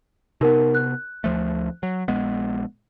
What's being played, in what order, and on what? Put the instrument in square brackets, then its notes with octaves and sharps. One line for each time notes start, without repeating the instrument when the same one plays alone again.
[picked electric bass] C3 B3 [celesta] D#4 A#4
[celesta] F#6
[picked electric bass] D2 F3 A3
F#3
A#1 G#3 B3